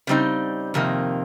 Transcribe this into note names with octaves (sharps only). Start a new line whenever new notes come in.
C#3 G3 C4 D#4
F2 C3 D#3 A#3